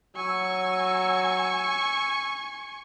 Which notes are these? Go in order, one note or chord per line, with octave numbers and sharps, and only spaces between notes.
F#3 G#5 C#6 E6